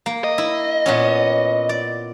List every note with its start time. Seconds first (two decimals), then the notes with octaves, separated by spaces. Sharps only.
0.06 A#3
0.24 D#5
0.38 E4
0.86 A#2 B3 C#4
1.69 D5